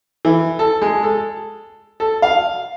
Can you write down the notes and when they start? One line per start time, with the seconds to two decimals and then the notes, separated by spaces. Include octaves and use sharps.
0.25 E3
0.59 A4
0.82 G#3
1.03 A4
2.00 A4
2.22 F5